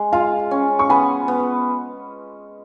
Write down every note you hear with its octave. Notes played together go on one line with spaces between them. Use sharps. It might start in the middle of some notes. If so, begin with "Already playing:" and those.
Already playing: G#3
F4 F5 G#5
C#4
C#6
B3 G#5 B5
B3